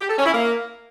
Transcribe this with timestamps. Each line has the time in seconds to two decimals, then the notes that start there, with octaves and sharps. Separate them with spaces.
0.01 G4
0.10 A4
0.18 C#4
0.26 E4
0.34 A#3